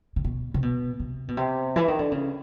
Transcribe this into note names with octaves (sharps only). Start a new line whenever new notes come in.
C3
B2
C3
B2
C3
B2
C3
E3
D#3
D3
C#3